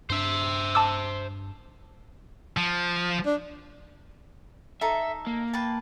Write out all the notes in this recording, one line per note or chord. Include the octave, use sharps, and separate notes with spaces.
G2 D4 C5 E5
A5 D6 E6
F3
D4
D#4 A4 E5
A#3
B4 G5 A5